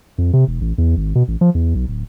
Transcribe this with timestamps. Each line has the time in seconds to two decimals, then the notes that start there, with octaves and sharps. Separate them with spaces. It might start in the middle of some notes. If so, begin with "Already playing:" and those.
0.18 F2
0.33 C3
0.47 E1
0.61 A1
0.78 E2
0.97 G#1
1.15 B2
1.28 A1
1.41 F3
1.55 E2
1.75 B1
1.88 D1